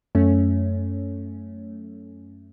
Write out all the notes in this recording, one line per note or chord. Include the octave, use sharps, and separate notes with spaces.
F#2 A3 C#4